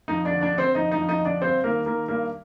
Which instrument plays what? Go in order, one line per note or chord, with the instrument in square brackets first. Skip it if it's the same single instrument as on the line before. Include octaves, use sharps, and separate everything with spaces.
[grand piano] F2 D#4 D#5
D4 D5
D3
D4 D5
D3
C4 C5
F2 D#4 D#5
D#4 D#5
F2
D#4 D#5
D3 D4 D5
G2 C4 C5
D#3 A#3 A#4
D#3 A#3 A#4
G2 A#3 A#4